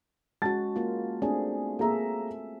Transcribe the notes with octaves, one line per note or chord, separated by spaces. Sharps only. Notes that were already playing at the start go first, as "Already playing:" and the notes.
G#3 C#4 F#4 A5 A6
A#3 F4
A3 C4 D4 G#4
A#3 G#4 A4 E5 A#5